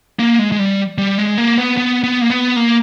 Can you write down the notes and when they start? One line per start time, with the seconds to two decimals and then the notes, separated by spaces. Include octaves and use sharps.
0.19 A#3
0.39 G#3
0.52 G#3
0.59 G3
0.98 G3
1.18 G#3
1.38 A#3
1.58 B3
1.77 B3
2.04 B3
2.21 A#3
2.30 B3
2.56 A#3